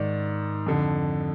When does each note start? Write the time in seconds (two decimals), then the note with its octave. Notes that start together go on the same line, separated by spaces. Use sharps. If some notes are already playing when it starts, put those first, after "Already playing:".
Already playing: G#2 D#3 D5
0.66 F2 D3